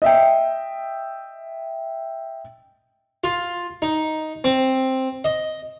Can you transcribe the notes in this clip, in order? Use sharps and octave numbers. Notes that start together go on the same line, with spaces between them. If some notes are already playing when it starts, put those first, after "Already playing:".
D#5 E5 G5
F4
D#4
C4
D#5